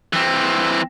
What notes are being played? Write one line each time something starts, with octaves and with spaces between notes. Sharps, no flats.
E3 C4